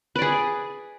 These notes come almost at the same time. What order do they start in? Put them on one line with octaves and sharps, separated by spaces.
B4 D5 G#4